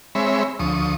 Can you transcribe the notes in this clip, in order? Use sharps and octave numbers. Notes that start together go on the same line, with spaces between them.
G#3 C4 C#5 E5 B5
D2 F3 C#6 D#6